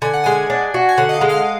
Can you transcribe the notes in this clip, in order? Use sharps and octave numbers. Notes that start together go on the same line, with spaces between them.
D3 G#5
F#5
G#3 G#5
D4
F#4
G#5
D3 F#5
D#5
F5
G#3
F5